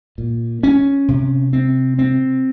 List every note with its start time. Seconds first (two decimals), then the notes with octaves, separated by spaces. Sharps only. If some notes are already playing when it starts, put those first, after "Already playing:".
0.18 A#2
0.63 C#4
1.08 C3
1.53 C4
1.99 C4